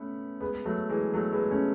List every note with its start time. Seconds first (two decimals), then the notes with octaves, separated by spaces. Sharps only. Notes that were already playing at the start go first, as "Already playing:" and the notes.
Already playing: A3 B3 C#4
0.40 G#3 B3
0.65 F#3 A3
0.90 E3 G#3
1.13 F#3 A3
1.32 G#3 B3
1.51 A3 C#4